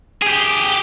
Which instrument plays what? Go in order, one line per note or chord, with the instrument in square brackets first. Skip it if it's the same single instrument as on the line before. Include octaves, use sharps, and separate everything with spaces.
[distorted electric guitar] G4 G#4